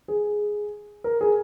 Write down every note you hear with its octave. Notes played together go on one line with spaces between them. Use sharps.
G#4
A#4
G#4